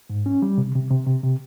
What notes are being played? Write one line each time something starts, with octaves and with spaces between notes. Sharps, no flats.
G#2
C#4
G3
C3
C3
C3
C3
C3